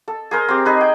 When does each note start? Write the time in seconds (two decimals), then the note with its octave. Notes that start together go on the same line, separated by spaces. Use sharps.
0.08 A4
0.31 G#4 A#4 C5
0.48 C4 G4
0.65 D#4 G#4 B4
0.81 G5